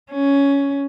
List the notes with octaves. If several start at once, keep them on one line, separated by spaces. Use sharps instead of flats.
C#4